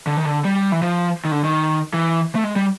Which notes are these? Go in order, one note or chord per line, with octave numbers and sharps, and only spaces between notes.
D3
D#3
D3
G3
E3
F3
D#3
D3
D#3
E3
A3
G#3
G3